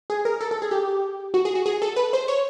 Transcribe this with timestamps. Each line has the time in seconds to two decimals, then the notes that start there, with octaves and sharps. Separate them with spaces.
0.10 G#4
0.25 A#4
0.41 A4
0.51 A4
0.62 G#4
0.71 G4
1.34 F#4
1.45 G#4
1.55 F#4
1.66 G#4
1.82 A4
1.96 B4
2.13 C5
2.28 C#5